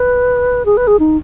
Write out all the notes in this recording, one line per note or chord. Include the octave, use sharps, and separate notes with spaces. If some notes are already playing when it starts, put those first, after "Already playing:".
Already playing: B4
G#4
B4
G#4
D#4